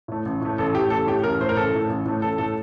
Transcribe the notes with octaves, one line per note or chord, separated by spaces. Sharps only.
A2 A3
A1
A2 A3
A1 A4
A2 A3 G4
A1 A4
A2 A3 G4
A1 A#4
A2 A3 C5
A#4
A1 A4
A2 A3
A1
A2 A3
A1 A4
A2 A3 A4